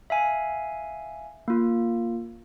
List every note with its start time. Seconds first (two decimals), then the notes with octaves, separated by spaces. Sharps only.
0.10 E5 F5 G#5
1.48 A#3 F4